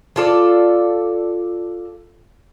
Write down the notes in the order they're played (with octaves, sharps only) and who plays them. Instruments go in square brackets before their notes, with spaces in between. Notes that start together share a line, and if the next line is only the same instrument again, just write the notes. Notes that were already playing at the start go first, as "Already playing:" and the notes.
[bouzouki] F4 A4 D5